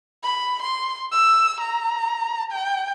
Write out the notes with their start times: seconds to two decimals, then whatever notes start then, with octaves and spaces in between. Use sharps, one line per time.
0.23 B5
0.62 C6
1.11 E6
1.60 A#5
2.52 G5